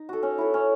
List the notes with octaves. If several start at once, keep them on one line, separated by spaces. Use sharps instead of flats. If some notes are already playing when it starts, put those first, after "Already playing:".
Already playing: D#4
F#4 A4
C#4
E4 A4
C#4